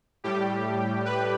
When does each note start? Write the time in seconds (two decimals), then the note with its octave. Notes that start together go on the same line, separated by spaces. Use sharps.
0.24 A2 G3 G4
1.05 B4